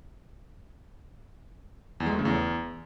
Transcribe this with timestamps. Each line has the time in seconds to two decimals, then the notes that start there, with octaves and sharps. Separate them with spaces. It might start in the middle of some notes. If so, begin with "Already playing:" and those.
2.00 E2
2.06 G#3
2.13 A3
2.19 C#3
2.25 E2